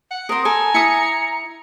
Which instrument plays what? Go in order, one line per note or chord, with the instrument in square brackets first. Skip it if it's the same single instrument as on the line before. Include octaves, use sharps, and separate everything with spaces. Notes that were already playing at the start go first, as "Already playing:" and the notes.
[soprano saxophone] F#5
[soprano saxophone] C4 [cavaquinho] A#4 C5 [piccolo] D#6
[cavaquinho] A4 [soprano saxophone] G#5 [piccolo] A#5
[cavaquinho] E4 D#6 [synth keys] C#7